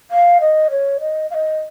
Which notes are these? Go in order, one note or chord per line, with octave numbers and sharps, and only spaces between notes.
F5
D#5
C#5
D#5
F5
D#5